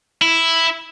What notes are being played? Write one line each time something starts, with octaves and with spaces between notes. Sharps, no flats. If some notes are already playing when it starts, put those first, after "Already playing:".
E4